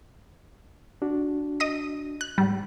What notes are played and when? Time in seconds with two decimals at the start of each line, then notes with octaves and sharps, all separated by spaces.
1.02 D4 F#4
1.60 D#5 D#6 A#6
2.21 F#6
2.38 G#2 G3